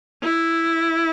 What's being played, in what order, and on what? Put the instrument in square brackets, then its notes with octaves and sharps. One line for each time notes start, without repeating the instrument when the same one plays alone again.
[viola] E4